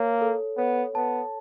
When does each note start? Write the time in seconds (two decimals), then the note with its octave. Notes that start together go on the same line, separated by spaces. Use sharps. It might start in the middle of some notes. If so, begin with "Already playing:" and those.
Already playing: A#3 C#5
0.21 A4
0.58 B3 C#5
0.95 B3 A5